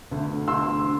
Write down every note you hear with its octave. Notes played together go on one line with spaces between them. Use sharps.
D2 D3
D2 C6 E6
D3